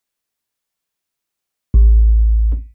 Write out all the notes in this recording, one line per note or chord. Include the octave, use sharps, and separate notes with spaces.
A1